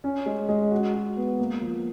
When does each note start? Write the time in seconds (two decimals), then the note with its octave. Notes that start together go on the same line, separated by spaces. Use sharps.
0.04 C#4
0.26 G#3
0.49 G#3
0.71 F#4
0.94 F#4
1.17 B3
1.40 A#3
1.61 F3